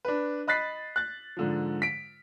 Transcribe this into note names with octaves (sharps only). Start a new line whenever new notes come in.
D4 B4
D#5 B5 F#6 A6 B6 C7
F#6 A6
G#2 D3 F3
B6 D7